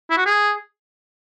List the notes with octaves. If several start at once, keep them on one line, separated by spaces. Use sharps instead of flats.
E4
F#4
G#4